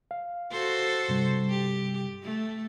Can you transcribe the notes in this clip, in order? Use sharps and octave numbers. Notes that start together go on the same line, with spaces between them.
F5
F#4 A4 C5
G2 C3 G3
G4
A3